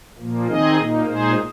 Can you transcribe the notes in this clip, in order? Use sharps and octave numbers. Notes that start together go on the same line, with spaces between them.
A#2 F3 A#3
D#3 C4 D#4 G#4 D#5
A#2 A#3 D#4
A#2 G#3 D#4 G#4 C5